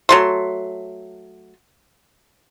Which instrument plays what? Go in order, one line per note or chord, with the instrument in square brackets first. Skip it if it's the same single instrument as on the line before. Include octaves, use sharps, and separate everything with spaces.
[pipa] F#3 A3 C6